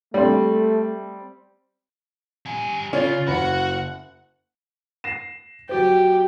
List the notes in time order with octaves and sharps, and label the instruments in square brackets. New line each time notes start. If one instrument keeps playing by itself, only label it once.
[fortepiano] G3 C4 [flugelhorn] A3
[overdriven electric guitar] G3 G#5
[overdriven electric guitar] C#3 [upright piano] C#4 [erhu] F4
[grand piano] F#1 B5 [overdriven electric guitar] F#4 [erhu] F#5
[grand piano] A#6 C7 E7
[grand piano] F#3 F#4 C5 [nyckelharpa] G4